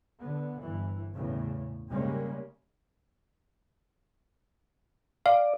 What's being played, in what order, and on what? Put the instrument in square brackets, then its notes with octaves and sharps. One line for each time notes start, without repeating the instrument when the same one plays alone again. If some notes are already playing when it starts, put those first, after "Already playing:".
[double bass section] D3 B3
G1 E3
E2 A2 C#3
G#2 C#3 G3 G#3 A#3 C#4
[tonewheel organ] D5 [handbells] F5